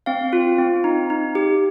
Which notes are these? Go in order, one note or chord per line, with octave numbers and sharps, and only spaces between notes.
C4 F5
F4
C4
D#4
D#4
G4